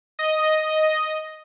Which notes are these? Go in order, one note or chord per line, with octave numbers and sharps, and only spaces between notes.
D#5